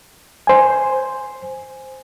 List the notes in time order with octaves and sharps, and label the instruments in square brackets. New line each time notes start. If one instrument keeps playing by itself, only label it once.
[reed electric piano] C5 G#5